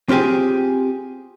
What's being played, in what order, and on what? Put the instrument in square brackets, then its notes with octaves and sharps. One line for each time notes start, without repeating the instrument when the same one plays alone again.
[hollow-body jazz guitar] C4 F4 G4 G#4